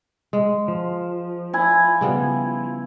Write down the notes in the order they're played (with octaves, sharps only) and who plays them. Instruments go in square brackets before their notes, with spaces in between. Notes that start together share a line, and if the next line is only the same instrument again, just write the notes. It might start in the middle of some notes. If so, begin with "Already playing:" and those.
[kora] G#3
[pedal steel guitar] F3
[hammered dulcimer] E4 G#5
[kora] C#3 G3 B3